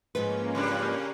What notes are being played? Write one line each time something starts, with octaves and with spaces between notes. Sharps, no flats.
G#2 F3 G#3 A#3 C#4 B4
C#3 G3 D4